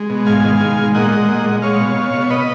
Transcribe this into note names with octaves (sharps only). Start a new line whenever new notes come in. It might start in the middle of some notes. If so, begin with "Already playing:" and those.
Already playing: G#3
B2
G#2 F5 G#5
D#3
G#3
G#3
A#2 D#5 F#5
G#3
A#2
G#3
G#3 C#5 F5
B2
B2
B2
C#5
B4 D#5